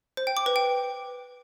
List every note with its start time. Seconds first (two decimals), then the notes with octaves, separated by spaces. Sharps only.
0.17 C5
0.27 G5
0.37 D6
0.46 B4
0.56 G5